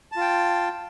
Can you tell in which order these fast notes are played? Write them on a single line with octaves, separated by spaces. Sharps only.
A5 F4 G5